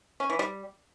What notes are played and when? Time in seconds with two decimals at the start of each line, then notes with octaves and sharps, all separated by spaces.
0.20 C#4
0.30 E3
0.39 G3